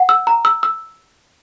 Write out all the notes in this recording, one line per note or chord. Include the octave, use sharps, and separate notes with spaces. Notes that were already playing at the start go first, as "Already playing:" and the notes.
Already playing: F#5
E6
A#5
E6
E6